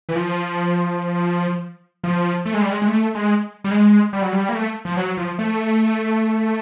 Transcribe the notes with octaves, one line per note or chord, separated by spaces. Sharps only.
E3
F3
F3
A3
G#3
G3
G#3
G#3
A3
G#3
G3
G#3
G3
F#3
G3
A#3
A3
F3
F#3
F3
A3